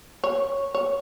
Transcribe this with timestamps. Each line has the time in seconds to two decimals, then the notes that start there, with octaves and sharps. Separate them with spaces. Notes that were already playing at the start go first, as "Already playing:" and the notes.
0.24 C#5
0.75 C#5